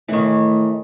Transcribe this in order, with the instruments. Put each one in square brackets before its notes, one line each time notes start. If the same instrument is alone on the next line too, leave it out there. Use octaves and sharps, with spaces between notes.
[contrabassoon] A2 [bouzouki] D#3 E3